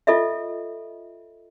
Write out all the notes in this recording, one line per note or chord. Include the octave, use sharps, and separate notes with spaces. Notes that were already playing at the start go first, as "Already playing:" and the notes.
F4 A4 D#5 E5